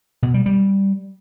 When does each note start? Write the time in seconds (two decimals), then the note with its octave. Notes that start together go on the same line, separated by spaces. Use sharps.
0.23 B2
0.34 G3
0.46 G3